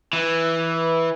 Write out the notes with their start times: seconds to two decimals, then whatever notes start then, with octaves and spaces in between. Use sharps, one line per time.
0.13 E3